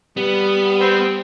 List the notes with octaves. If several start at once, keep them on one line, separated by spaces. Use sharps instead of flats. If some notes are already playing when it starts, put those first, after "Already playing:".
G3 B3
C4